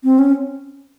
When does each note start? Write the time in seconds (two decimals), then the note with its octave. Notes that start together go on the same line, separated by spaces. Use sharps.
0.04 C4
0.19 C#4